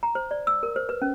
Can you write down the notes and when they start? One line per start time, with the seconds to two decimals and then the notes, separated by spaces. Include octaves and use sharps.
0.03 A#5
0.15 C5
0.31 D5
0.47 E6
0.63 A#4
0.76 C5
0.89 B4
1.02 C#4